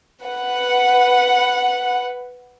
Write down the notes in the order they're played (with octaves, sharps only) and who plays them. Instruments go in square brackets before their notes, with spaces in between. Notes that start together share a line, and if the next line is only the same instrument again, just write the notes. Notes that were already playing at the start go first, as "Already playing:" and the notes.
[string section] B4 F#5